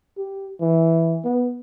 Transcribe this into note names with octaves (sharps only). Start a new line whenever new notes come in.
G4
E3
B3